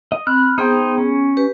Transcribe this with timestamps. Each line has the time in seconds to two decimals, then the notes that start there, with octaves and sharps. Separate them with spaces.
0.12 D#5
0.27 C4 B5 F6 F#6
0.58 B3 D#4 G#4 C5 G5
0.98 C#4
1.37 G4 B4